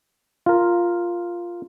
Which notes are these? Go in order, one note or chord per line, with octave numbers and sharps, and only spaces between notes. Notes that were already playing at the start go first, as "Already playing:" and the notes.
F4 A#4